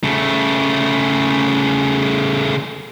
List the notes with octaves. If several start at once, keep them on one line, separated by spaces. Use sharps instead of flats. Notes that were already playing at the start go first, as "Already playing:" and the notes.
C#3 A3